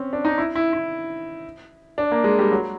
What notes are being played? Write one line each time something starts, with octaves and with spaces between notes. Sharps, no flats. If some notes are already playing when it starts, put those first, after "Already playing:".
Already playing: C4 C#4
D4
D#4
E4
E4
E4
D4
A#3
G#3
G3
F#3